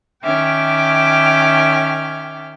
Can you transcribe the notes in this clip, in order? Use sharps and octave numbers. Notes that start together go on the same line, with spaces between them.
D#3 C#4 E5 G5 D6 F6